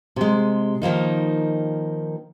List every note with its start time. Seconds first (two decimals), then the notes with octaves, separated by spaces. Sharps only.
0.16 C3 G#3
0.82 D#3 F3 A#3 D#4